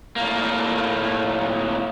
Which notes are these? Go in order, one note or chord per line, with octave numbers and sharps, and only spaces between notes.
A2 A#3